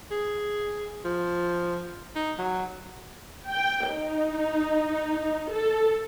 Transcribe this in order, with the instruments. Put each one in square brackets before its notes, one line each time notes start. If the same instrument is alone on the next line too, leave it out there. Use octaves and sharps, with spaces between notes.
[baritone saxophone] G#4
F3
D#4
F#3
[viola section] G5
D#4
A4